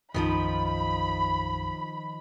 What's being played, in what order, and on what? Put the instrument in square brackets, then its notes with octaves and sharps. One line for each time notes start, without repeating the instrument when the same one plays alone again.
[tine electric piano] B1 F#2 [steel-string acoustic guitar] D#3 F3 F4 [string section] B5